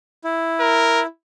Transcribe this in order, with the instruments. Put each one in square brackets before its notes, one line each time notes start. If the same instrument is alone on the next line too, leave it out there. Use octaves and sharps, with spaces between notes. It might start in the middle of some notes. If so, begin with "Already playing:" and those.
[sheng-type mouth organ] E4
[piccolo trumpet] A#4